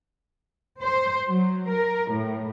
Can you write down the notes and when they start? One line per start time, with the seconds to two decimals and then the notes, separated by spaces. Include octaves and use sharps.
0.82 C5
1.29 F#3
1.70 A#4
2.11 A2